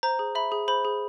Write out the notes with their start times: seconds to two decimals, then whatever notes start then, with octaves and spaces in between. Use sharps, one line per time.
0.03 C5 A#5
0.19 G#4
0.35 E5 B5
0.52 G#4
0.68 C5 B5
0.85 G#4